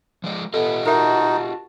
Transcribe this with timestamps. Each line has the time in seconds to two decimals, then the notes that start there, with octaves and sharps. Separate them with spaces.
0.24 F3 G#3 D5
0.54 B3 F4 G4 A4 D#5
0.86 D#4 F#4 A#4 E5 A5